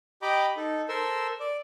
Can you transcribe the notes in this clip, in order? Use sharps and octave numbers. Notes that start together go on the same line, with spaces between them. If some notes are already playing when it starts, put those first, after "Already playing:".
G4 D#5 G5 A#5 B5 D6
D#4 A4
A4 A#4 C5 E6
D5